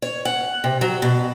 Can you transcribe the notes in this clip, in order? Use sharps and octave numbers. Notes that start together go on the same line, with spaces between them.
C#5
F#5
C3
F#3
B2